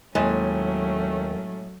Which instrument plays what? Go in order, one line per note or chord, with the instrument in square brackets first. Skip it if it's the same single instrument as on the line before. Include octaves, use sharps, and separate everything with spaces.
[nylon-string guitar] D#2 [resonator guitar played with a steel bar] A2 G#3 G#5 [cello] F#3 [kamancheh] A3 C#4